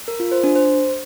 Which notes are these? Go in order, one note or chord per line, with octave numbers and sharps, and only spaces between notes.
A#4
F4
C5
D4
C5